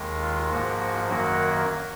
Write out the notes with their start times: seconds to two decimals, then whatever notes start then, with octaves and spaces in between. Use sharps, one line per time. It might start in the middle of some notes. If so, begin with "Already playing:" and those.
Already playing: D#2 D#3 G#3
0.22 F4
0.51 G#2 F3 A#3 F#4
0.80 F#4
1.09 F#2 D#3 F#3 A#3 F#4